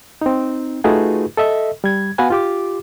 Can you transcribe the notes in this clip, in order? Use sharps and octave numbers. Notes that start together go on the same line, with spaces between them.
C4 D#4
A3 D#4 F4 F#4 G#4 B4
A4 D#5 E5
G3 G#6
B3 F#4 B4 F5 F#5 G#5
F4 G4 D6